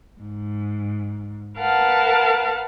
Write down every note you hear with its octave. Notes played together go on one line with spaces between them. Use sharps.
G#2
A#4 B4 F5 F#5 A5